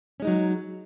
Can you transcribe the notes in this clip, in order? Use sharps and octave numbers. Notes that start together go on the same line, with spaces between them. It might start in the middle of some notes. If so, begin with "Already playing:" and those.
F#3 G#3 C#4 D#4